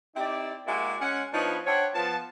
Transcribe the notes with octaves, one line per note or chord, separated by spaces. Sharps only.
C4 D#4 E4 G4 D5
G#3 A#3 E4 F#4 G4 D5
G#3 C#4 F#5
F3 B3 D4 D#4 B4 C#5
D4 C5 C#5 E5 F#5 G5
F3 B3 A5